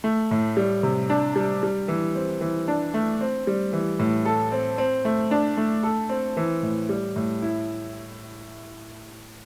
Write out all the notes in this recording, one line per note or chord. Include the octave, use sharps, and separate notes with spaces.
A3
A2
G3
C3
D4
G3
G3
E3
C4
E3
D4
A3
C4
G3
E3
A2
A4
C4
C4
A3
D4
A3
A4
C4
E3
A2
G3
A2
E4